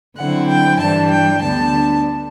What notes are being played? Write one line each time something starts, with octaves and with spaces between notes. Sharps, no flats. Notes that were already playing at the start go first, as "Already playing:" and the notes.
D3 F#3 C4 E4 F#5
G5
G2 E3 G3 D4 A5
G5
D2 D3 G3 B3 D4 A5